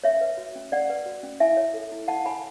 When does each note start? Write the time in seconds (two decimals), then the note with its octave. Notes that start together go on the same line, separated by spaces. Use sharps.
0.04 C#4 C#5 E5
0.21 B4
0.38 F#4
0.55 C#4
0.72 C#4 D5 F#5
0.90 B4
1.06 F#4
1.23 C#4
1.40 E4 E5 G#5
1.57 C#5
1.74 A4
1.92 E4
2.08 E4 F#5 A5
2.25 C#5 G#5 B5